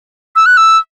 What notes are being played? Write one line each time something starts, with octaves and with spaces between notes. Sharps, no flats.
E6
F#6
E6